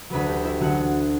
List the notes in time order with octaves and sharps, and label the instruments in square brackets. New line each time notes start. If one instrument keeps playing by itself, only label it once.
[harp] D2 D3 F#3 B4 B5
G4 G5
E4 E5
D2 D3 F#3 F#4 F#5